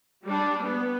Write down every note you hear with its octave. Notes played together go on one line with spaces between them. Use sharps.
G3 D4
B3